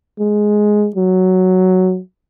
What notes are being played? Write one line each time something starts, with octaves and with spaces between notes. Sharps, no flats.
G#3
F#3